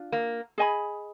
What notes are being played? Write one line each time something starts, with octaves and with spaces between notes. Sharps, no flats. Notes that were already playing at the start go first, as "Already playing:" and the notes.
Already playing: D4 F4
A#3
G#4 D#5 G#5 B5